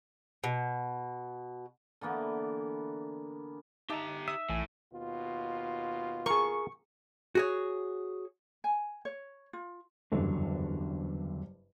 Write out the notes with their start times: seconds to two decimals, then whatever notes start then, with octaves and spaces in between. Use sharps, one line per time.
0.44 B2
2.01 D3 E3 A#3 B3
3.90 D#4 G4 E5 A5 A#5
4.28 E5 D#6
4.50 A#1 A2 E3 G#5
4.93 D#2 B2 F4
6.26 G#4 A#4 C#6
7.35 F#4 G#4 C#5
8.64 G#5
9.05 C#5
9.53 F4
10.12 F#1 E2 G2 D3 F#3